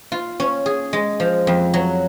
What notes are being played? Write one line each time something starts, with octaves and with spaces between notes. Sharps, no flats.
F4
C#4
G#4
G#3
F3
F2
F#3